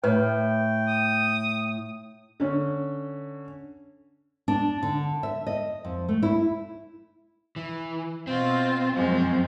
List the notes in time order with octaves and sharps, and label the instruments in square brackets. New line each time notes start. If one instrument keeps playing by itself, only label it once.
[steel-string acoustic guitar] A2 [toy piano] B4 [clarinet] G5
[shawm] D#6
[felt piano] D3 C#4
[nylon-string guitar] D4
D3
E5
D#5
F2
A3
E4
[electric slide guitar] E3
[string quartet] B2 F4 [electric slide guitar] C4
[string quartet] F#2 F3 G#3